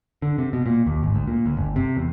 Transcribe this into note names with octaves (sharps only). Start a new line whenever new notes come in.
D3
C3
B2
A#2
D#2
G#1
D2
A#2
D2
G1
C3
E2